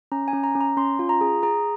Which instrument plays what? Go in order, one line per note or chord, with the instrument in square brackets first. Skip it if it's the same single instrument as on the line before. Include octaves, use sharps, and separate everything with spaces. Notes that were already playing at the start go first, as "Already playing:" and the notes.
[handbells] C#4 A#5
G#5
C#4
A#5
C#4
A#5
C#4 C6
F4
A#5
G#4
G#4 A#5